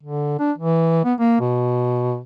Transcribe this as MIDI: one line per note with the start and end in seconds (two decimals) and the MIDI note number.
0.03 0.36 50
0.39 0.52 62
0.58 1.03 52
1.04 1.14 59
1.19 1.39 58
1.40 2.20 47